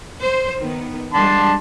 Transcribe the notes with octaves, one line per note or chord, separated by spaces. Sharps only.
C5
D#3 B3
G3 G#3 D4 A5 C6